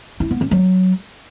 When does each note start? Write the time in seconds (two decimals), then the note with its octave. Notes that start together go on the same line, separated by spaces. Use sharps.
0.20 E4
0.31 B3
0.41 C#4
0.51 F#3